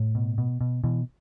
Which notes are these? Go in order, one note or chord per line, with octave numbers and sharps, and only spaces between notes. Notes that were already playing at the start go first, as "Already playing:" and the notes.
Already playing: A2
B2
B2
B2
B2 E3